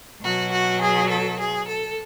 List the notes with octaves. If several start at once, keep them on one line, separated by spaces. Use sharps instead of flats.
B2 F#3 F#4
F#4
G#4
A4
G#4
A4